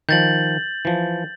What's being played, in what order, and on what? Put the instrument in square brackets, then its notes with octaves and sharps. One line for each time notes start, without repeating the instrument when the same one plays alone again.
[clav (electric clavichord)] D#3 F3 [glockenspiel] G6 A6 F#7
[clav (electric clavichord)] E3 F3